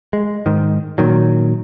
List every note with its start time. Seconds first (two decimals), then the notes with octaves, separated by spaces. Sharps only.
0.13 G#3
0.46 G#2 D#3
0.98 A#2 D#3 F#3